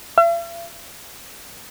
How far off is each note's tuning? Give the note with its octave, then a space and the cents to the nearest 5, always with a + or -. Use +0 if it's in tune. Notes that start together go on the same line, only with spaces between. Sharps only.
E5 +45